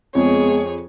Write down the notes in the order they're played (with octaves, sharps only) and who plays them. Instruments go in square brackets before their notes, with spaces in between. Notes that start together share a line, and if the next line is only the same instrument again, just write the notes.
[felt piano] F2 [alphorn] G#3 [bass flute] B3 [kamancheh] G#4 C#5